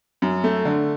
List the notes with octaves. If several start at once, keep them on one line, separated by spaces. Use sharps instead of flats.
F#2
A3
D3